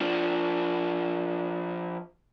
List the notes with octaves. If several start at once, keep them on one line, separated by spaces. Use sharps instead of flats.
F3 D4